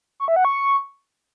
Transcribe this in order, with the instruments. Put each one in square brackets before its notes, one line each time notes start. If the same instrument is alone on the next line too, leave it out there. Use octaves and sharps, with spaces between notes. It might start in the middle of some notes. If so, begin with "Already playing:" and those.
[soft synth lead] C#6
E5
F#5
C#6